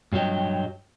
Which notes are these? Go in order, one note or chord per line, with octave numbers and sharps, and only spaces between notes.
G2 F#3 G4 D#5